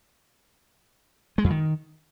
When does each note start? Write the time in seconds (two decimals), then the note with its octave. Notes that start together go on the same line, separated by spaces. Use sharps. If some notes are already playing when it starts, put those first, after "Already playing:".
1.38 G#3
1.44 F2
1.50 D#3